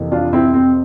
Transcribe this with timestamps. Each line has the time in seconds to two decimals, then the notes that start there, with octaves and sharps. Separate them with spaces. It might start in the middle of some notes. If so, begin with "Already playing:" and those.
Already playing: F2 C3 E3 A#3
0.12 D4 F4
0.33 C4 E4
0.54 C4